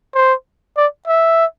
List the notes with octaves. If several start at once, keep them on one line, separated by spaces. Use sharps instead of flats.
C5
D5
E5